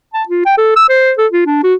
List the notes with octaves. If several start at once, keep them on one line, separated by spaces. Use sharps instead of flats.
A5
F4
G5
A4
E6
C5
A4
F4
D4
F#4